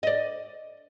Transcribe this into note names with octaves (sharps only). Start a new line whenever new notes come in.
D5 D#5